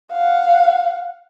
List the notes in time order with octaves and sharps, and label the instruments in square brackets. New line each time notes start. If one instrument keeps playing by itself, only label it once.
[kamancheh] F5 F#5